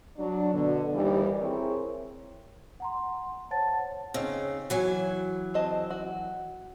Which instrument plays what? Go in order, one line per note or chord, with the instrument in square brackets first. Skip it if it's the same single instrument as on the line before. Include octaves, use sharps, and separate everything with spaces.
[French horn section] F#3 D4
B2 D3
D#2 D#3 E3 G3
C4 E4 G#4 A#4 C#5
[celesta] F#5 A#5 C6
C5 C#5 F#5 A5 A6
[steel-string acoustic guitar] C#3 [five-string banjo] C4 D#4
[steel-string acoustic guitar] E3 F#3 G#5
[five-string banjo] C4 D#5 A5
F#4